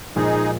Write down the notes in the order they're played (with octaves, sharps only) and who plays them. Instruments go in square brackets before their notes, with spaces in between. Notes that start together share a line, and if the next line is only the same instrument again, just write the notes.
[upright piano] A#2 F3 G#3 [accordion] D#4 G#4